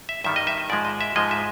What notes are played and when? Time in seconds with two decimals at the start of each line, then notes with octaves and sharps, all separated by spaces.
0.09 E5
0.24 G2 D#3 G3 E5
0.36 D#5
0.47 E5
0.70 G#2 F3 G#3 D5
0.85 D#5
1.01 E5
1.16 G#2 F3 G#3 D#5
1.31 E5